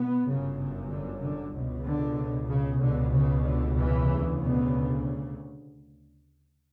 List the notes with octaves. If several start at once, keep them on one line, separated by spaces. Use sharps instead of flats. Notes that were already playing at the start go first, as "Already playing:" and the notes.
Already playing: B2 B3
G1 F#2 C#3
C#3
D3
D3
C#2 B2
D3
C#3
C#2 B2 D3
C#3
D3
E2 E3
D2 C#3
B2 B3